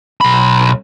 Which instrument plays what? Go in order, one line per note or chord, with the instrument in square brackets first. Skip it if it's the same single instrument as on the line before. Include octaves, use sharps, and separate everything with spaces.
[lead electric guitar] B1 B5